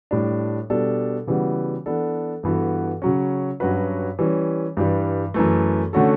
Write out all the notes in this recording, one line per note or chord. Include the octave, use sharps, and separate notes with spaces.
A2 G3 D4
B2 G3 D4 A4
C#3 E3 G3 B3 F#4
E3 B3 D4 A4
G2 E3 B3 F#4 A4
C#3 F#3 C#4
G2 F#3 C#4 F#4 B4
E3 G3 C#4
G2 E3 G3
F#2 E3 A3
D3 A3 C#4 F#4 A4